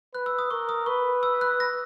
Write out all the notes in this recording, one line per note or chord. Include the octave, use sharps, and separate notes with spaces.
B4 F#6
E6
D#6
A#4 C#6
D#6
B4 C#6
E6
F#6
A#6